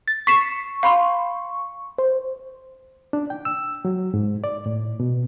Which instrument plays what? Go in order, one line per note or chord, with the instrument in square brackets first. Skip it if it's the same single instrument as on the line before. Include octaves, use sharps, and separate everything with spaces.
[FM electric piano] A6
[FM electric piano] C#6 [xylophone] B6 C7 E7
[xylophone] F5 B5 C6
[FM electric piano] C5
[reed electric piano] D4
G5
E6
F#3
G#2
D5
A2
B2